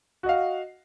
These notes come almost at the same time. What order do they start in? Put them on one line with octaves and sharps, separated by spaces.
F#4 D#5 F5